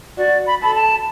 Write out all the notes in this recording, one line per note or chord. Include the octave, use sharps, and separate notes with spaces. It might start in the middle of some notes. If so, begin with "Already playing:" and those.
F#4 D5
B5
A4 B5
A5